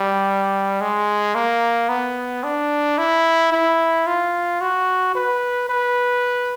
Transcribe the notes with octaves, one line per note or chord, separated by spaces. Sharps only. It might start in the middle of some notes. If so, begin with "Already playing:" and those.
Already playing: G3
G#3
A#3
B3
D4
E4
E4
F4
F#4
B4
B4